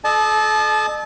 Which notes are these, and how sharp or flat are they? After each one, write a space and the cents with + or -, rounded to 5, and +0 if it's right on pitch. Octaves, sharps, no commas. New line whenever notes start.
A4 -40 D#5 -40 A5 -30